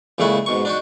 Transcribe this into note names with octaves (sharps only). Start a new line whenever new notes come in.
C#2 A#2 C#3 A3 E4 F#5
G#2 B2 C#6
D4 D#4 F#4